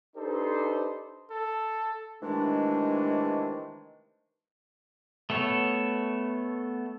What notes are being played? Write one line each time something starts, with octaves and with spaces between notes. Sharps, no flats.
D4 D#4 G4 A4 B4 C5
A4
C3 D#3 E3 G#3 A3 D4
A3 B3 A4 C#5